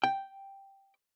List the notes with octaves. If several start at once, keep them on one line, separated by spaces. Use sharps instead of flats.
G5